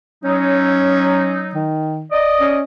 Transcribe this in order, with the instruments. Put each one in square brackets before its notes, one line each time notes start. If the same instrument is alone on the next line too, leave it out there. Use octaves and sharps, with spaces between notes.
[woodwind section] F#3 D#4 [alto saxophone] C#4
[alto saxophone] D#3
[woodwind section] D5 D#5
[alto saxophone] C#4